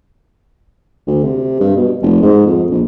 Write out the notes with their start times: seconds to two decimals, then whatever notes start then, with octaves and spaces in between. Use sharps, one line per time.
1.07 D2
1.23 C3
1.60 G2
1.77 B2
2.02 F1
2.22 G#2
2.46 F2
2.71 A#1